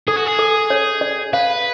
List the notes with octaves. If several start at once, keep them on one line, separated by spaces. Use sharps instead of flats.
G#4 A4
F#4
G#4
A4
C#5
D5
B4 F5